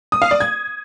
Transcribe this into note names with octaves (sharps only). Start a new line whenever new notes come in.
D#6
F5
D5
G#6